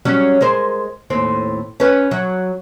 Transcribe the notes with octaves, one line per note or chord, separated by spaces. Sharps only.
F#3 G3 C#4
G#3 A#4 C5
D#2 A2 C4
C#4 B4
F#3